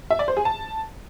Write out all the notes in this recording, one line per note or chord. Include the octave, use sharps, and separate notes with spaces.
E5
D5
C5
G#4
A5